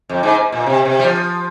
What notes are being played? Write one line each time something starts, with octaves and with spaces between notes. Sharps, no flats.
F2
G#2
A#2
C3
C3
G3
F3